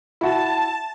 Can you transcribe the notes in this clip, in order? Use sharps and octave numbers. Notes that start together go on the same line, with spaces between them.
E4 F#4 A5